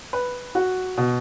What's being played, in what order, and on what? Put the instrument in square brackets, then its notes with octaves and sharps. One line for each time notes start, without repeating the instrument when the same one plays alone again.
[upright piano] B4
F#4
B2